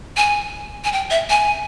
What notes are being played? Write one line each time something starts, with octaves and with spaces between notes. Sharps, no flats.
G#5
G#5
G5
E5
G#5